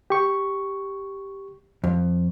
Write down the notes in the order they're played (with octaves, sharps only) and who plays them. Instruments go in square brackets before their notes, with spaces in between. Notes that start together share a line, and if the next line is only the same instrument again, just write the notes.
[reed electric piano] G4 C#6
[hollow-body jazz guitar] F2